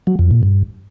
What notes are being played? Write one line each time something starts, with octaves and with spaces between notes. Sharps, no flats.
F#3
F2
A#2
G2